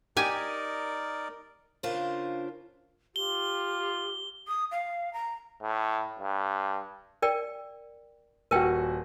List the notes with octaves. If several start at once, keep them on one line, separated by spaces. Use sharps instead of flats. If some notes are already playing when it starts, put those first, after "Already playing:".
D#4 G4 A#4 D5 G#5
C#3 D4 F4 A#4 C5
F4 G4 G7
D#6
F5
A#5
A2
G2
A#4 D5 G5
D#1 F#4 A#4 B4 G5